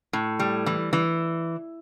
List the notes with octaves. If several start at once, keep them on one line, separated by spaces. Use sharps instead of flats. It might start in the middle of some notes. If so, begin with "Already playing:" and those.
A2
G3
E3
E3